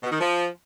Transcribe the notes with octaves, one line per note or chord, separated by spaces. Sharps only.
B2
D#3
F3